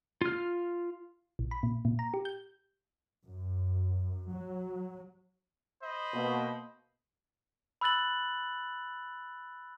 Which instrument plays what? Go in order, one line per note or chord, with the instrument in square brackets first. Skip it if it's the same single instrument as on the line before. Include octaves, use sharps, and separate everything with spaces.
[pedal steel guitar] F4 F6
[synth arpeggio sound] A#1
B5
A#2
A#2
A#5
G4
G6
[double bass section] F#2
F#3
[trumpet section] C5 D#5 B5
[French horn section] B2 A#3
[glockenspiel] B5 E6 F#6 A6 F#7